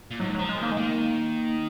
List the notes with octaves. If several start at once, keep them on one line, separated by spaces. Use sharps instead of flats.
A#2
G#2 F#3
F3 F#3
G#3
D#3 A#3
G#3
D#3 A#3